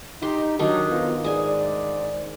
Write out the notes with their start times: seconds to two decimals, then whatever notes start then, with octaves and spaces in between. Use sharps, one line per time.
0.22 D#4 G4 C6
0.59 D#3 F#3 D4 D#4
0.89 F2 B3 F4
1.24 G#2 G#4 D5 G#5